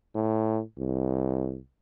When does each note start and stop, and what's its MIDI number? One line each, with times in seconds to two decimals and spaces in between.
0.15 0.61 45
0.78 1.58 36